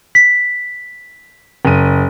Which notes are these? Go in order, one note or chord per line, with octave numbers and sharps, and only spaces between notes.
B6
F#1 D#7